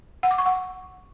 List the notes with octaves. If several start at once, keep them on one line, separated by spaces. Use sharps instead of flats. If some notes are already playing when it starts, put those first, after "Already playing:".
F#5
D6
C#6
F#5